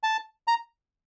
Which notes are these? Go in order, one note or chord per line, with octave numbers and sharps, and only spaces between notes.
A5
A#5